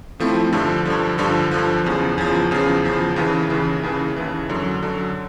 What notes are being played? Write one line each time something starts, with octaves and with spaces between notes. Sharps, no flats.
A2 F3 A3 C4 E4
G2 D3 F3
G2 D3 F3
G2 D3 F3
G2 D3 F3
E2 C#3 F3
E2 C#3 F3
E2 C#3 F3
E2 C#3 F3
D#2 C#3 E3
D#2 C#3 E3
D#2 C#3 E3
D#2 C#3 E3
F#2 D3 F#3
F#2 D3 F#3